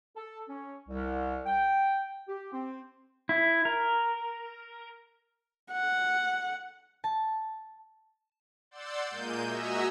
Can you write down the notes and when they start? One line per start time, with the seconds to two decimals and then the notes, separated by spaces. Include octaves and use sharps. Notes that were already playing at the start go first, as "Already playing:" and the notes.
0.16 A4
0.49 C#4
0.89 C2
1.46 G5
2.28 G4
2.53 C4
3.29 E4
3.65 A#4
5.72 F#5
7.04 A5
8.71 D5 F#5 C6 E6 G6 A6
9.10 A#2 G#3 A#3 G6 D#7
9.43 F#4 D#5 E5 G#5 A#5 E6